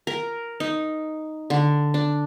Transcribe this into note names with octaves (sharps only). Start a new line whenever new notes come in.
A#4
D#4
D3
D4